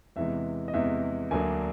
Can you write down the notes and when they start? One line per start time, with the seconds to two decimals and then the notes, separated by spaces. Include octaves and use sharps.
0.16 E2 C3 E3 G#3 E5
0.68 D#5
0.74 E2 C3 E3 G#3 E5
1.31 D2 D3 F#3 A#3 D4 G#5